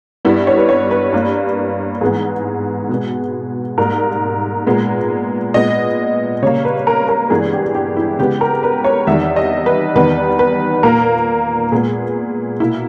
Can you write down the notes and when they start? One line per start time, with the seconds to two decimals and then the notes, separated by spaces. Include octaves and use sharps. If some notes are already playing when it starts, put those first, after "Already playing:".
0.25 G2 G3 B3 E4
0.47 C#5
0.57 B4
0.69 C#5
0.91 B4
1.13 G2 G3 A#3
2.01 G#2 E3 G#3 B3 G#4
2.89 B2 G#3 B3
3.78 G#2 G3 A#3 A#4
4.67 A#2 G#3 B3
5.54 A#2 G#3 B3 D#5
6.42 C#3 G3 A#3 C#5
6.65 B4
6.87 A#4
7.09 A#4
7.30 G2 E3 G#3 B3 G#4
7.53 G4
7.75 G4
7.97 E4
8.19 C#3 G#3 B3 G4
8.41 A#4
8.63 B4
8.84 C#5
9.07 E2 D#3 G3 E5
9.36 D#5
9.66 B4
9.95 E2 D#3 G3 B3 B4
10.39 B4
10.83 A#2 A#3 A#4
11.72 A#2 G#3 B3 G#4
12.60 B2 A#3 E4